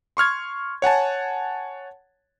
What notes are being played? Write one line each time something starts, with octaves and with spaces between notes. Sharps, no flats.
C6 C#6 F6 G#6
C#5 F#5 G#5 A5